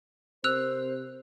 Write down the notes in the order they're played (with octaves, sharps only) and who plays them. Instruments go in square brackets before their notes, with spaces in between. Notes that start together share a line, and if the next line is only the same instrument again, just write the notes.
[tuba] C3 [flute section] A#4 C5 [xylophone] E6 F#6 F7